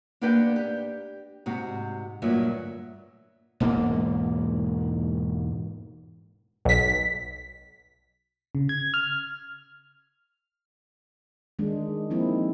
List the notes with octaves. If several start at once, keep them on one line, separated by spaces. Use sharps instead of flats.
A#3 B3 D4 G4 B4 G5
G4
G#2 C3 F#4
D2 G2 A#2 F#3 E5
E1 G#2 A#3
B1 B6
C#3
G#6
F6
D#3 G#3 D4
F3 A#3 C4 D#4 E4